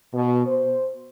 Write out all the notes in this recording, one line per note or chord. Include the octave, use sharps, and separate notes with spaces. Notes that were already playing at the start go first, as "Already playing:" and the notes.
B2
C5